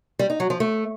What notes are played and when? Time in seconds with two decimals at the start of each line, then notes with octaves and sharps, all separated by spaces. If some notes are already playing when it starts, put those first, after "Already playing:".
0.19 G3
0.30 D#4
0.40 F#3
0.50 F3
0.60 A3